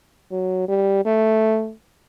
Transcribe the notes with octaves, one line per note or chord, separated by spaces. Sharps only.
F#3
G3
A3